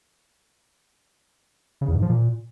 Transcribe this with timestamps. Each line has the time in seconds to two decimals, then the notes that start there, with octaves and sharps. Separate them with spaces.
1.81 C#3
1.88 E2
1.95 G#2
2.02 F3
2.09 A#2